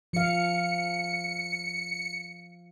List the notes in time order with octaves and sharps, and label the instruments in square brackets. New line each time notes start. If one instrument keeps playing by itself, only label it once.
[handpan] F3 F5 [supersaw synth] C#7